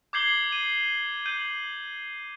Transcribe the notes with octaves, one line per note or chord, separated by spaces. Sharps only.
D6 G6 G#6 C7 F#7 G7
D#7
G6 D#7 F#7